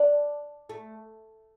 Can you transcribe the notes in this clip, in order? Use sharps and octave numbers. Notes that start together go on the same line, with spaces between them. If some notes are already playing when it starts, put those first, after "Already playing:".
Already playing: D4
A3